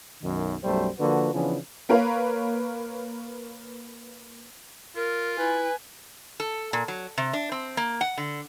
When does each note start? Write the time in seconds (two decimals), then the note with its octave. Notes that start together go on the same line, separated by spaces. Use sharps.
0.22 B1 F#2 D#3
0.64 B1 F#2 G3 A3 C5
0.99 D3 F3 A#3 F#4 B4
1.34 C#3 E3 F3 B3 C#4 D4
1.89 A#3 A#4 B4 C#5 F5
4.95 F4 A#4
5.39 E4 B4 G#5
6.40 A4
6.73 A#2
6.88 F#3
7.18 C3
7.33 D4
7.52 C4
7.77 A#3
8.01 F#5
8.18 D3